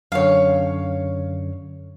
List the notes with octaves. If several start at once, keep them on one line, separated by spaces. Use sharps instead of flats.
F#2 D3 C#5 F5